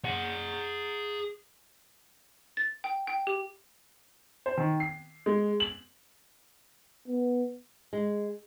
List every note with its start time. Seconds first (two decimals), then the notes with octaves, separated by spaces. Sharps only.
0.05 G#4 F#5
2.57 A6
2.84 G5
3.07 G5
3.27 G4
4.46 C5
4.57 D#3
4.80 C7
5.26 G#3
5.60 F#7
7.08 B3
7.93 G#3